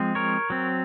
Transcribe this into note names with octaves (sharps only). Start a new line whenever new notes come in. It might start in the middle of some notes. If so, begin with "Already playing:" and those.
Already playing: F3 G#3 C4
A#4 C#5
F#3 C4